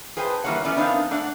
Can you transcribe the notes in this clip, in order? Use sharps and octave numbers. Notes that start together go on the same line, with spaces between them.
G#4 B4 C5 G5 A5
E3 G3 A#3 F4 C#5 F#5
E3 A3 B3 C#4 D5
B3 C4 D4 D#4 A#4 F5
A3 D4 D5 F#5